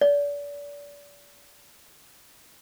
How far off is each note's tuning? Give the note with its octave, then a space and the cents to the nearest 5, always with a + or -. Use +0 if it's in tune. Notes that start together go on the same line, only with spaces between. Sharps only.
D5 -35